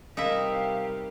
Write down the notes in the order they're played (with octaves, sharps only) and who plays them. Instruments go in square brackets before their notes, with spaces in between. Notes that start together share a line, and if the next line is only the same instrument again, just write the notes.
[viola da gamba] C3 G3 G4 [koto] D#4 E4 E5 [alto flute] A#4 [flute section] F5